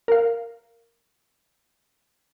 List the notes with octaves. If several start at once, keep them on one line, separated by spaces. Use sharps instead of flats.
A#4 F5